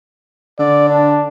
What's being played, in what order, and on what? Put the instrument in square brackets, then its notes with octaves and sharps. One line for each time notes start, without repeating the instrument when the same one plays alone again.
[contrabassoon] D3 [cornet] D5
[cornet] D4